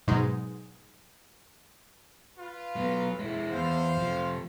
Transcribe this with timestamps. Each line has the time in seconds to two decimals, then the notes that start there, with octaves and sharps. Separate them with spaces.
0.07 G#2 B2 F#3 G#3 D#4
2.38 F4 B4
2.76 F#3 B3
3.19 G#3 E4
3.51 E2 C5 F5
3.98 C3 F3